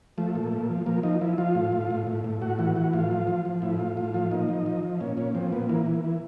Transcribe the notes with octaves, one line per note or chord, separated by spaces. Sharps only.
F3 A3
A#2
A#2
F3
F3 A#3
F3 D#4
F3 E4
F3 F4
A2
A2
A2
A2
A2
A2 F#4
E3 F#4
E3 F#4
A2 F4
F3
F3
F3
A2 E4
A2 F4
A2 F4
F3 F4
A#2 D#4
F3
F3
F3
A#2 C#4
A#2 C#4
F3 C4
A#2 B3
E3 A#3
E3
E3